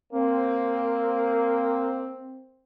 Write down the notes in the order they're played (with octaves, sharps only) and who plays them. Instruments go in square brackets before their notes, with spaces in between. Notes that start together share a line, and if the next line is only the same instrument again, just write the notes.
[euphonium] A#3 [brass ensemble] C4